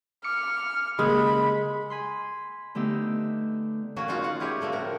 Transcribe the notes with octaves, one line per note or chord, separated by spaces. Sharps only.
D6 F6 C#7
C#3 G#3 A#3 B5
G#5 B5 C6
D3 A3 B3 D#4 G4 E6
F#3 A#3 C#4 F#4
C#4 D#4 F4 F#4
F4 F#5
G#3 E4 G4 C#5
D3 A3 A#3 F#4
A2 F3 A#4